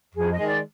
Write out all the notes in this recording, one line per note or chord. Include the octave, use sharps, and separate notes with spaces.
F2 G#4
D#5
D#3 G#3
D5